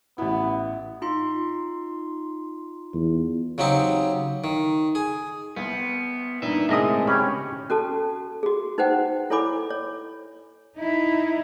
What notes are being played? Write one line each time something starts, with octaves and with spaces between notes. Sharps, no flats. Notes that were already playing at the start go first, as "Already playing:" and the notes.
A1 B3 E4
D#4 F4 C6
E2
C#3 F#3 C4 D#4 G4
D#3
G#4
C2 B3
G2 A#2 D#4 B4 E5
A2 C#3 G#3 C4 A#4 D#5 E5 D#6
C#4 G4 C#5 G5 B5
C#4 F#4 A4 A5
F#4 G#4
D#4 B4 C5 F#5 G5
E4 A4 C#5 G#5 B5 D6
C#5
D#4 E4